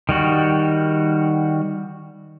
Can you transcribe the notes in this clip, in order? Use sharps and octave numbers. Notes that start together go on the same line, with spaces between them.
D#3 G3 F#4